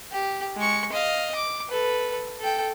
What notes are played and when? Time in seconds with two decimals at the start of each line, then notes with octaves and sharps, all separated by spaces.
0.12 G4
0.57 G#3 C#6
0.92 D#5 F5
1.35 D6
1.69 A4 B4
2.40 A4 G5